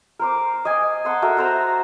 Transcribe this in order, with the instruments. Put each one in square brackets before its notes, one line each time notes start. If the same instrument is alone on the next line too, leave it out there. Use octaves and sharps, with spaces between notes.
[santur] A#4 C5 D6
D#5 G#5
F#5 A5 C6 E6
F#4 A4 A#4 E5
A4 C5 A#5